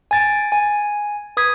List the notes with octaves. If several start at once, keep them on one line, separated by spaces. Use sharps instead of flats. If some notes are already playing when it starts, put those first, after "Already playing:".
G#5 A6 D7
G#5
B4 D#6 G#6 B6